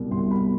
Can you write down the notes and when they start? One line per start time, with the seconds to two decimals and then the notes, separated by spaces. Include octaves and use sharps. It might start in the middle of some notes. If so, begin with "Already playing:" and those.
Already playing: C2 B2 G3
0.11 C2 B2 G3 C6
0.31 B5